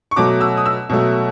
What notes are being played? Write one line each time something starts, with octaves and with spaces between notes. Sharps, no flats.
C#6
B2 F#3 A3 D6
E6
D#6
E6
B2 F#3 A3